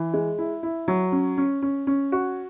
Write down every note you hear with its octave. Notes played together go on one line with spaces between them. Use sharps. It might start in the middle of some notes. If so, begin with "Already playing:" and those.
Already playing: E3
G#3
E4
E4
F#3
C#4
C#4
C#4
C#4
F#4